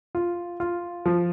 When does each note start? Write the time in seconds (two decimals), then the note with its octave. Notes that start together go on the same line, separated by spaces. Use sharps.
0.15 F4
0.60 F4
1.06 F3